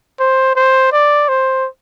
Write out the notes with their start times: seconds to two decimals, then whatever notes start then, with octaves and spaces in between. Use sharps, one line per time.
0.20 C5
0.56 C5
0.92 D5
1.28 C5